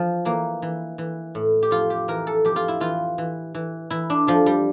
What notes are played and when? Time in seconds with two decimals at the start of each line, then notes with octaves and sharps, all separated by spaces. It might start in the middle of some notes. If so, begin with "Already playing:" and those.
Already playing: F3
0.25 E3 A#3
0.62 E3
0.98 E3
1.35 A2
1.63 G4
1.71 F2 F4
1.90 G4
2.08 E3 A#4
2.27 A4
2.45 F2 G4
2.56 F4
2.68 E4
2.80 E3 F4
3.18 E3
3.55 E3
3.90 E3 E4
4.10 D4
4.27 F2 F3
4.46 G3